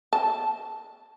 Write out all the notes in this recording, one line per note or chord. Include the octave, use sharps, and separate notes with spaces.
A5